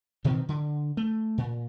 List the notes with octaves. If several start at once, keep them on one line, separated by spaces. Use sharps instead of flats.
B2 D#3 F3 C4
D3
A3
A#2